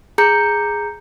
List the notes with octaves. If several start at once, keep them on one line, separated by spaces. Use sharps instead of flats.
G#4 A#5 G6 C#7